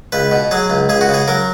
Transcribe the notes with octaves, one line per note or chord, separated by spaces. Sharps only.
C#2 B4
B2
F#3 G#4
C#2
C#2 G#4
F#4
C#3 G#4
F#3 A#4